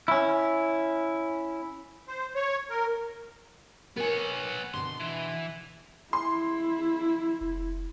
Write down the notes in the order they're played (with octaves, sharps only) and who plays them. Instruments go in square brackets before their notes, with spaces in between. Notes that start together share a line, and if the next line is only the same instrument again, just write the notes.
[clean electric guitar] C#4 E4
[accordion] C5
C#5
A#4
[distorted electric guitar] B3 C#5 [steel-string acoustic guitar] A#4 G#5
[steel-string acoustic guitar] B2 D3 [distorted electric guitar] C6
[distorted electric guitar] E3
[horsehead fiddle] E4 [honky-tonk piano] C6
[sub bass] F1